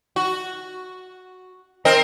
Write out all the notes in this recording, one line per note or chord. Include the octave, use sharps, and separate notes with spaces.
F#4
C4 A#4 D#5